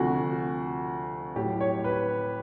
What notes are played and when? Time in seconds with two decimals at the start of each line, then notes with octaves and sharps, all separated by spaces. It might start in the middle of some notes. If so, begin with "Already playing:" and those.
Already playing: D2 C3 F3 F#4
1.36 A2 F#3 G4
1.60 C#5
1.84 B4